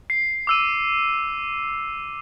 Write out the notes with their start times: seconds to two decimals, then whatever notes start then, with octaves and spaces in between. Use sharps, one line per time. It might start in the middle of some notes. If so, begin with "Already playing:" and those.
0.10 C7
0.47 D6 E6 D#7